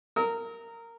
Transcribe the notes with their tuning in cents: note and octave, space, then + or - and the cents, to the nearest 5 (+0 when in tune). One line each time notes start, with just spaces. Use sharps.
A#4 -15 D#6 +45